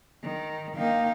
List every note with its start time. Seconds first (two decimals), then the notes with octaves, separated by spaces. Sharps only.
0.23 D#3
0.77 D#3 A#3 D#4 F5 G5